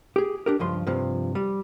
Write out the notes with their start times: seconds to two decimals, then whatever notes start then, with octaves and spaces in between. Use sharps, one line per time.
0.16 G4 G#4
0.46 D4 G4 A#4
0.59 C#2 G2 F3 C6
0.87 G2 C3 F3
1.35 G3